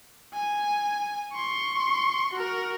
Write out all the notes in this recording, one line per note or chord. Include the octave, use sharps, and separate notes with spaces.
G#5
C6 C#6
F#4 A#4